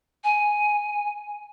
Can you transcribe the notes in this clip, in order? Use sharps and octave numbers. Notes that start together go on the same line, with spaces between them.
G#5